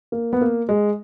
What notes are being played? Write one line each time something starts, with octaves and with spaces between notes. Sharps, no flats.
A#3
B3
A#3
G#3